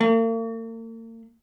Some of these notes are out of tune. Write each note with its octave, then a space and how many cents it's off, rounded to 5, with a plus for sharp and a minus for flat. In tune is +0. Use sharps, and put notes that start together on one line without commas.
A#3 -45